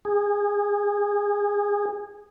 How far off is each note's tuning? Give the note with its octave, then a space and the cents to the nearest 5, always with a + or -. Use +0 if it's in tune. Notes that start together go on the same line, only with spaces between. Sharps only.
G#4 -20